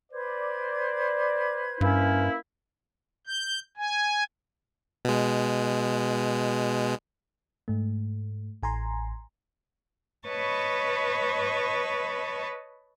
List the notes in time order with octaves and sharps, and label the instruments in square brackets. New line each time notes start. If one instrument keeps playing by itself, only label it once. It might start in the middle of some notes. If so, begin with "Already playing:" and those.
[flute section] B4 C5 G#6 [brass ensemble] D5
[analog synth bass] G2 [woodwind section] A#3 C#4 E4
[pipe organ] G6
G#5
[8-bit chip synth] B2 G#3
[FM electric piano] G#2 A3
A1 G#5 A#5 C6
[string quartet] B4 C#5 D#5 A5 B5 C#6